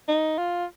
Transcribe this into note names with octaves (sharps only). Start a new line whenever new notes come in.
D#4
F4